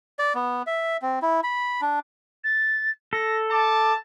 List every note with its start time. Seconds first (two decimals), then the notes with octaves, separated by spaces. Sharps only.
0.19 D5
0.35 B3
0.67 E5
1.02 C4
1.22 E4
1.43 B5
1.81 D4
2.44 A6
3.13 A4 A#6
3.51 A5 D6